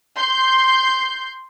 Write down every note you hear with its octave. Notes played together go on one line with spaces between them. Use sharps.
C6 G6